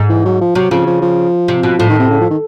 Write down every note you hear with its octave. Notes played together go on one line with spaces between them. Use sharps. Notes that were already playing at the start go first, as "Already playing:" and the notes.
Already playing: G#2
E3
F#3
F3
C3 F#3
C#3 F3
F3
F3
C3
B2
A2 F3
D#3
C3
C#3
F3
D#3